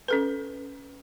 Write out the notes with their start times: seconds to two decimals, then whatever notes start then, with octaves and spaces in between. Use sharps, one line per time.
0.08 C#4 A4 B4